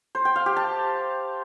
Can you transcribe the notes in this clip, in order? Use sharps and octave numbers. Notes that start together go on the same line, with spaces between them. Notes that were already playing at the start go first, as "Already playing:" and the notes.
C5
G5
F5
G4
A5